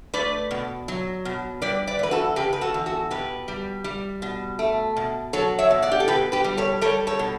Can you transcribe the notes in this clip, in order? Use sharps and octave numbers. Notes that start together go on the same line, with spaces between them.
A3 B4 D5
B2
F#3
B2
G3 B4 D5
B4 D5
E2 B4
F#4 A4
C#3 G4 B4
B4
F#4 A4
E2
F#4 A4
B2 G4 B4
G3
G3
B2
A3
B2
F#3 A4 C#5
C#5 E5
B2
D5 F#5
G4
A4
B2 G4 B4
G4 B4
G3
A4 C#5
G3 A4 C#5
A4 C#5
B2